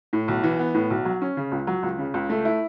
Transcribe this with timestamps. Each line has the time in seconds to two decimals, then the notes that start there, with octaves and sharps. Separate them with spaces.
0.13 A2
0.28 B1
0.43 E3
0.59 B3
0.74 A2
0.90 B1
1.05 F#3
1.22 C#4
1.37 C#3
1.52 C#2
1.67 F#3
1.83 C#2
1.98 C#3
2.14 C#2
2.30 A3
2.45 E4